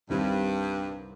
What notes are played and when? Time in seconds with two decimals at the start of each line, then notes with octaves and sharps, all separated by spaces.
0.09 C2 G2 C3 D#3 G3 C4